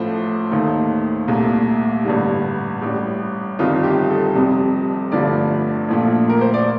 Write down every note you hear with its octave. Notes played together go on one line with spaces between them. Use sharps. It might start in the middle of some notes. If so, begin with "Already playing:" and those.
Already playing: A1 A2 F3 A3 C5
D#2 D#3 A3
C2 A#2 A3
A1 G2 D3 G3
A1 A2 G3
G1 F2 D#3 G3 F4
G4
A4
F1 F2 C3 G3
G1 G2 D3 F3 A3 D5
A#1 A#2 F3 A3
A#4
C5
D5